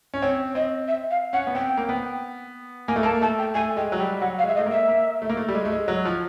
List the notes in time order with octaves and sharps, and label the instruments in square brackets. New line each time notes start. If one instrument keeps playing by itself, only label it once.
[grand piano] C#4
[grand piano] C4 [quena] C#5
[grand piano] C4 [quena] D#5
[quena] E5
F5
[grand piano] C#4 [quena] F#5
[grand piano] B3
[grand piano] C4 [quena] G5
[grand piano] A#3
B3
[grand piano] A#3 [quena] G#5
[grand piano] A3
[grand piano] A#3 [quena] A5
[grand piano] A3 [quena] A5
[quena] G5
[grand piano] A3 [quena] G#5
[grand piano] G#3 [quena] G5
[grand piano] F#3
[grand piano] G3 [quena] G5
[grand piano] F#3 [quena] F#5
[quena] F5
[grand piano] G#3 [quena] E5
[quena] D#5
[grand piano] A3
A#3
[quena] E5
[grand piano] A#3
A3
A#3
A3
G3
G#3
A3
G#3
F#3
F3